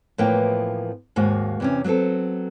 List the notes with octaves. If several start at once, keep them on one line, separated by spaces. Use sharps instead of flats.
A2 E3 F3 A#3 B3 G5
D#2 G#2 A#3 F#4
E2 C3 C#4
F#3 G3 B3 C4 A4